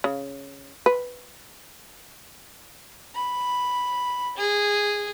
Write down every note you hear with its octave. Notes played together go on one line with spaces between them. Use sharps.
C#3
B4
B5
G#4